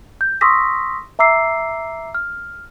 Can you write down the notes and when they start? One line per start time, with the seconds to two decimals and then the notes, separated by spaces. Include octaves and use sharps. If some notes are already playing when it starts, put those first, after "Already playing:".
0.21 G6
0.41 C6 C#6 D#6 E6 A#6 B6
1.19 E5 A#5 D6 E6 C7
2.15 F6